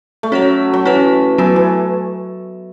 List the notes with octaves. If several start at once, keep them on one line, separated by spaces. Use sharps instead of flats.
A3
F#3 C#4 F#4 C#5
F#3
E3 C#4 F#4 C#5
E3 F#3 B3 F#4
E3